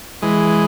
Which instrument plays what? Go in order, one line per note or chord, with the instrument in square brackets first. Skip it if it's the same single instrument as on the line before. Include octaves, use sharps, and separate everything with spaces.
[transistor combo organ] E3 G#3